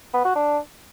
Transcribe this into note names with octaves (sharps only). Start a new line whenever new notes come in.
B3
F#4
D4